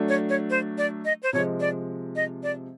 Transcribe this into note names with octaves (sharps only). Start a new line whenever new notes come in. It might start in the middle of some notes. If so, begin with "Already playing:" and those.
Already playing: F#3 A3 D4
C#5
C#5
C5
D5
D#5
C5
C3 F3 G#3 C#5
D5
D#5
D5